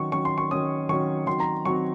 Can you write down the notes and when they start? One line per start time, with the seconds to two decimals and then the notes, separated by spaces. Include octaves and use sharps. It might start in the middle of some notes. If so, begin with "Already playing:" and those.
Already playing: D#3 F#3 C#4 C#6
0.12 D#3 F#3 C#4 C#6
0.25 C6
0.38 C#6
0.51 D#3 F#3 C#4 D#6
0.89 D#3 F#3 C#4 C#6
1.27 D#3 F#3 C4 C6
1.40 A#5
1.65 D#3 F#3 C4 C#6